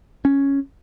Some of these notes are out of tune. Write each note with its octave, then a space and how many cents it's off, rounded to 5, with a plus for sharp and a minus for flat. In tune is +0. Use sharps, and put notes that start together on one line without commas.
C#4 +0